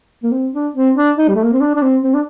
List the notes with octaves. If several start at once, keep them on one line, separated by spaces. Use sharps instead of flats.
A#3
C4
D4
C4
D4
D#4
G3
A3
A#3
C4
D4
D4
C4
C4
D4